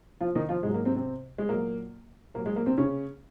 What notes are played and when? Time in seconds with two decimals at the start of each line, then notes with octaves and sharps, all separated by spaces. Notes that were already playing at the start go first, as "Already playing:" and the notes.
0.21 F3 F4
0.35 D#3 D#4
0.49 F3 F4
0.63 G#2 F#3 G#3
0.74 A#3
0.85 C3 C4
0.95 C3 C4
1.38 G#3
1.49 A#2 F#3 A#3
2.34 A#2 A#3
2.38 F#3
2.46 G#3
2.56 A#3
2.66 C3 C4
2.78 C#3 C#4